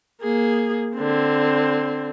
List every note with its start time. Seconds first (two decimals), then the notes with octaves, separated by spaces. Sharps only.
0.21 A#3 G#4
0.95 D3 C4